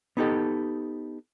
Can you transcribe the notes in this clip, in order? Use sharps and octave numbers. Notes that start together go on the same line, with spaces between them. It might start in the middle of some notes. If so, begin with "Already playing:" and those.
B3 D#4 G4 A4